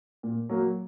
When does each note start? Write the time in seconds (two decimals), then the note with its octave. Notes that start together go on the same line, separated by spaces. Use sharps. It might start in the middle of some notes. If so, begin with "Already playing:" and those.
0.23 A#2
0.49 F#3 A#3